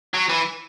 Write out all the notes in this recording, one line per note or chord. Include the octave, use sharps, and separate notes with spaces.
F#3
E3